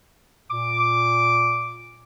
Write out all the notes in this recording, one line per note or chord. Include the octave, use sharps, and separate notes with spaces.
A#2 D6